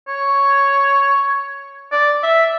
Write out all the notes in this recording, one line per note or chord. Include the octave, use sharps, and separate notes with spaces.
C#5
D5
E5